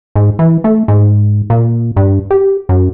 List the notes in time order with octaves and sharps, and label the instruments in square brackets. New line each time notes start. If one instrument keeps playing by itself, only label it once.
[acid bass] G#2
E3
A3
G#2
A#2
G2
G4
F#2